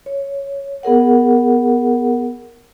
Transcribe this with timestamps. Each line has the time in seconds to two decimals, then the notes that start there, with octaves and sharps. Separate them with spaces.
0.06 C#5
0.83 B3 G#4 A#4 F#5